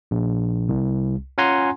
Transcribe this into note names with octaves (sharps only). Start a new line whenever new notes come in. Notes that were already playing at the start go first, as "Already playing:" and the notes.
A#1
C2
C#4 F4 F#5 G#5 A#5 C6